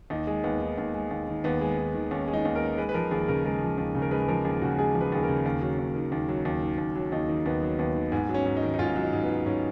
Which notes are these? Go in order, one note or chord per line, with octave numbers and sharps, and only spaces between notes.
D#2 D#4
G#3
D#2 B3
D#3
D#2
G#3
D#2
D#3
D#2 B3
G#3
D#2
D#3
D#2 C#4
G#3
D#4
D#2
A#4
D#3
G#3 B4
B4
F3 A#4
D#2 G#4
C#3 A#4
G#3 A#4
F3
D#2
C#3
A#4
G#3 B4
F3 A#4
D#2 G#4
C#3 F#4
G#3 G#4
F3
B4
D#2 G#4
A#4
C#3
D#2
F#3
D#2
D#3
D#2
F#3
D#2
D#3
D#2
F#3
D#2 D#4
D#3
D#2 B3
F#3
D#2 B3
D#3
G#2 B3
F#3
C#4
G#2
D#4
D#3
D#4
G#2 F4
F#3
D#4
G#2
B3
D#3
G#2 C#4